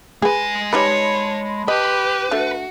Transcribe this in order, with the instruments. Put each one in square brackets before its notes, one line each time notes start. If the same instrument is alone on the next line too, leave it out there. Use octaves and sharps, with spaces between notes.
[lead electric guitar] G#3 G#5 [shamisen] G#4 B4
[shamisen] G3 D#4 B4 [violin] C#5 [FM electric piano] A5 B5 C6
[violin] G4 [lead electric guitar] B4 [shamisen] D#5
[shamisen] A3 D4 [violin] F#4